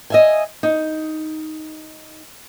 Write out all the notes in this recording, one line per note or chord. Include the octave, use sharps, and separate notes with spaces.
D#5 E5 G#5
D#4